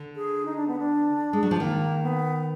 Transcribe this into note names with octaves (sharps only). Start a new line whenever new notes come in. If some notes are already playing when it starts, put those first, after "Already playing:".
Already playing: D3
G#4
D#4
D4
B3
D4
G#3
F#3
F3
D#3 A#3
B3